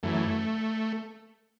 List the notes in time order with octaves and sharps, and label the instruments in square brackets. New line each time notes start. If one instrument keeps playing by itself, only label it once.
[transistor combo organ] F#2 E3 A3